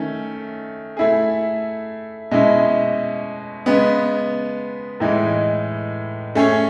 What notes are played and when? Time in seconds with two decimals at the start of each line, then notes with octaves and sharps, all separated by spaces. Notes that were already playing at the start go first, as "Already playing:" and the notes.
Already playing: D#3 A3 C#4
0.97 A3 E4 G#4
2.31 B2 G#3 C#4 E4
3.66 C#3 G#3 B3
5.00 A2 E3 G#3 D#4
6.35 A3 C#4 G#4 C#5